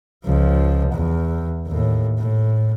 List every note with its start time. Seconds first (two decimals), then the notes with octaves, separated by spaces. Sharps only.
0.25 C#2 F3
0.93 E2
1.67 D#2 A2
2.19 A2